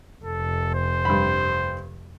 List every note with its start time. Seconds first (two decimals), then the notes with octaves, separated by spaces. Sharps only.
0.24 F1 A4
0.74 C5
1.05 G2 B5